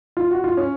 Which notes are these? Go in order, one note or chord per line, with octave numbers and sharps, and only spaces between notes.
F4
F#4
F4
C#4